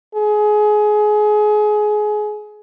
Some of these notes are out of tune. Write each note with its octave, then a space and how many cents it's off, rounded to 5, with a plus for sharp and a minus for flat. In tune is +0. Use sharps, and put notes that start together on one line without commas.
G#4 +25